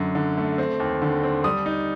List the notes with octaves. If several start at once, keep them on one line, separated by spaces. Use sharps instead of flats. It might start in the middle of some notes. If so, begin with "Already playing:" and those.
Already playing: F#2 D3
D3
A3
C4
D#2
D3
C4
G3 D#6
D#4